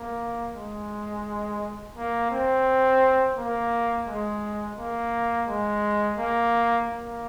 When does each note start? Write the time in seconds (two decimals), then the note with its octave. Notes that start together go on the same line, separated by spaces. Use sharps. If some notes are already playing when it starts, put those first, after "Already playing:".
Already playing: A#3
0.55 G#3
1.96 A#3
2.31 C4
3.37 A#3
4.07 G#3
4.78 A#3
5.48 G#3
6.18 A#3
6.88 A#3